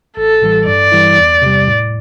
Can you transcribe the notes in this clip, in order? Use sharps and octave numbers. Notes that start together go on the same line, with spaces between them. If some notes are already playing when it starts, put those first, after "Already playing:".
A1 A4
A2 E3 G3
G2 D5
E3 G3 E4
E2
C3 G3
A2